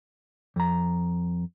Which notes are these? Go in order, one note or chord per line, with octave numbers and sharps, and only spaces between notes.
F2 A#5